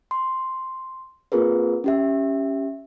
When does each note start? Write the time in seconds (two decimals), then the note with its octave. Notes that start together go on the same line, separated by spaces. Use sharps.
0.11 C6
1.32 A#3 C4 F4 G#4 A#4 B4
1.84 C#4 G4 E5